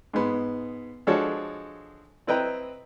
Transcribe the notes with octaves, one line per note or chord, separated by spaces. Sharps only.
G#2 G#3 B3
F3 G#3 D4 F#4 A4 C#5
C4 E4 B4 D#5 G5 A#5